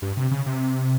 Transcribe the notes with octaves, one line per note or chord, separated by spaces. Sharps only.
G2
C3
C#3
C3